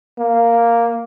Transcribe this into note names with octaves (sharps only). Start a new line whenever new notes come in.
A#3